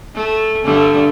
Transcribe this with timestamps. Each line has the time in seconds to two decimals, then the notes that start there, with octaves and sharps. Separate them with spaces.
0.15 A3
0.64 G2 D3 A3